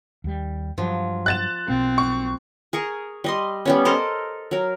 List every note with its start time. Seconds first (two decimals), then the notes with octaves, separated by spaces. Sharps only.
0.24 D#2 G3
0.78 G2 F3 F#3
1.26 F#6 A6 E7
1.68 B1 B2 A#3 C4
1.98 C#6
2.73 G#4 A#4 C#6
3.24 G3 D#5 C6
3.65 G3 B3 C#4
3.85 A4 A#4 C5 D#5
4.51 F#3 A#4